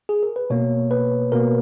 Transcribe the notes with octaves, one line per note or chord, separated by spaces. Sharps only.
G#4
A#4
B4
B2 A#3 C#5
B4
B2 A#3 A#4